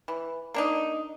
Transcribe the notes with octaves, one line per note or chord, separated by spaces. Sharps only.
E3
A#3 D4 D#4